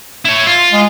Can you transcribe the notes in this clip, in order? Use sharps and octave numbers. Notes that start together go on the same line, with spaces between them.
E4 C#5
F4
G#3